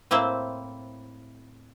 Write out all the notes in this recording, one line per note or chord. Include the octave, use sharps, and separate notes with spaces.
A2 A#3 C4 E4 C5